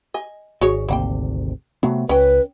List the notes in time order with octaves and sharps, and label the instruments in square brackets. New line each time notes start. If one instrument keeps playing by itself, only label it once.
[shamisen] D#5 G#5
[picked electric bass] G#1 [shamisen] F#4 G#4 C#5
[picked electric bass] G#1 D2 C3 [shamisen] A#3 F#5 G5
[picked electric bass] C3 A3 B3 [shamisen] F#3
[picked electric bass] C#2 [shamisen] C#4 G5 [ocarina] B4